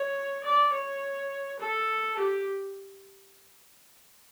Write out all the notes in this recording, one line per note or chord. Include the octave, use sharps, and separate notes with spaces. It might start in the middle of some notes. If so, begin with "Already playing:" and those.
Already playing: C#5
D5
C#5
A4
G4